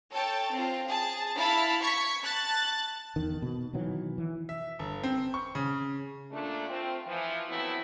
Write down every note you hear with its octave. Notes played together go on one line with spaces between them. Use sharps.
A4 C#5 G5 A5
C4 F4
G#4 A5
E4 F5 A5 B5
C#6 G#6 B6 C#7
A5 F#6 A6
E2 D#3
B2
B2 D#3 E3 F#3
E3
E5
G1
C4
C#6
C#3
A#2 A3 D4
A3 C4 F4
E3 F3
E3 F#3 A3 B3 C4 E4